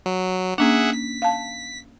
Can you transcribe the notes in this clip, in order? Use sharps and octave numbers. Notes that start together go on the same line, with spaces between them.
F#3
A#3 C#4 D4 G#4 E5 F#5
B6
F5 A5